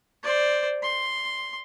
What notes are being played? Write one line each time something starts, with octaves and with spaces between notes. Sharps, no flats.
C5 D5
C6